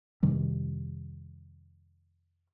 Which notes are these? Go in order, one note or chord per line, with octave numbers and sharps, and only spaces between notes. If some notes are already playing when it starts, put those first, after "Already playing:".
F2 C3 D#3 G3